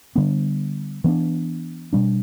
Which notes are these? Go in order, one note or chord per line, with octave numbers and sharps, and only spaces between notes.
D3 G3 B3 D4
E3 B3 D4
B2 G3 D4